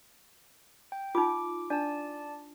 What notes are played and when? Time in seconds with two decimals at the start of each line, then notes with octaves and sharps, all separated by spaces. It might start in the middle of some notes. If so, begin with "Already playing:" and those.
0.92 G5
1.15 D#4 F4 D6
1.70 D4 D5 A5